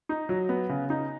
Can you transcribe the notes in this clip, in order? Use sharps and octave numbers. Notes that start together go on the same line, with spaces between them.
D#4
F#3
B3
C#3
D#4